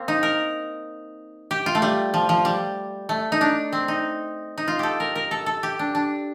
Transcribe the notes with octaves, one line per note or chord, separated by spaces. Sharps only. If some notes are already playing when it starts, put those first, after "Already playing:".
Already playing: A#3 C4
D#4
A#4
G4
F4
A3
G3
F3
F3
G3
A3
D#4
D4
C4
D#4
D#4
F4
G4 A4
A#4
A#4
A4
A4
G4
D4
D4